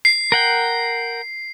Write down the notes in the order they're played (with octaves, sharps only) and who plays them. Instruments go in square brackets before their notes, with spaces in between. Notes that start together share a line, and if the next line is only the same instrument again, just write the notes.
[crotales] C7
[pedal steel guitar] A#4 F#5 G5